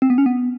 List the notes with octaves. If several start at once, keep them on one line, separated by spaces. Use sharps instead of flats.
C4
B3
C#4
B3